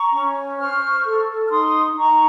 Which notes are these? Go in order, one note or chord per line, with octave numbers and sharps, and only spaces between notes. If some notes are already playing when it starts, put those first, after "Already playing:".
Already playing: A#5 C#6
C#4
C5 C#6 F6
A4
F6
D#4 C6 D#6
D#4 A#5 C#6